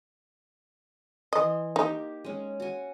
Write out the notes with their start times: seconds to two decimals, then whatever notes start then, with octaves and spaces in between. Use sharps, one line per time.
1.33 E3 D#5 C6
1.76 A#3 D#4 G4
2.24 G#3 C#4
2.60 F#4 G#5